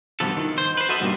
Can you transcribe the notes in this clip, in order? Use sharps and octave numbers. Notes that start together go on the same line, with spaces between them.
G2 B2 E3 F3 B3 A4
D#3
C5
B4 C5
F#4 A4 D#5 E5
G2 B2 D#3 F3 G3 A#3